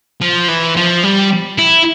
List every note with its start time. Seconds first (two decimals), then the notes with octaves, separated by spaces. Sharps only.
0.21 F3
0.49 E3
0.77 F3
1.03 G3
1.58 E4